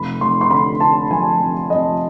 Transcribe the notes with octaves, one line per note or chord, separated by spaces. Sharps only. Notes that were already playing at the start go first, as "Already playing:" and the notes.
Already playing: F1 B5
F1 C6
C6
D3 B5
D3 A5
F3 G#5
F2
F2 D#5